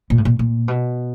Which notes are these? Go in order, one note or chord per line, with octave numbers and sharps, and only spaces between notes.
A#2
A2
A#2
A#2
B2